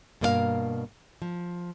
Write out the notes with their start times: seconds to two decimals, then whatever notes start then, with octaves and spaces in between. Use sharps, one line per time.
0.21 G2 B2 A#3 E4 A#4 F5
1.22 F3